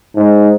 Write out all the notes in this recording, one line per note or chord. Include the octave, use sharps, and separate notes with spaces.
G#2